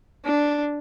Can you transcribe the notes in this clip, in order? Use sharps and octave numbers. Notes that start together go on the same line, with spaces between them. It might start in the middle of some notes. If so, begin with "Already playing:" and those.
D4